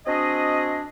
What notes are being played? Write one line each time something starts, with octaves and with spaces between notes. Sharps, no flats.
C4 D4 F#4 G#4 D#5